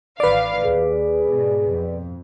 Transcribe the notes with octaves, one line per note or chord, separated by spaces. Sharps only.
A1 D#3 B4 D5 F5
D#2 G#4
G#2 B2
F2